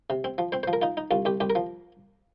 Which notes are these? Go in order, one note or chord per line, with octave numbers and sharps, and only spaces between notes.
C3
C4
F3
C4 C5
C5
F3
A#4
D#4 F4
D#4
C2 F4
C2 G4
C2 G4
A#4
F3